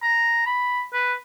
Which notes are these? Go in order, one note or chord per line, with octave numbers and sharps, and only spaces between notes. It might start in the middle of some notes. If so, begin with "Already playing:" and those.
A#5
B5
B4